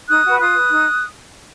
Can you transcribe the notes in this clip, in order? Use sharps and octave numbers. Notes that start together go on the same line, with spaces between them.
D#4 D#6 F#6
F#4 B4
F4 D#6 F#6
B4
D#4